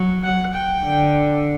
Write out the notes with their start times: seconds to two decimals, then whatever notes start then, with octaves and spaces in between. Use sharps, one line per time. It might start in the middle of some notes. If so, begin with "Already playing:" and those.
Already playing: F#3
0.23 F#5
0.54 G5
0.84 D3